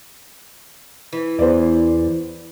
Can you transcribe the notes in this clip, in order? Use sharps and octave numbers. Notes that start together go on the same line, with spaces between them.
E3
E2 C5 D5